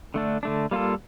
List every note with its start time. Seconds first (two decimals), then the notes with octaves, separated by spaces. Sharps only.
0.14 D3 A3 D4
0.43 D3 A3 D4
0.71 G3 A#3 F4 A4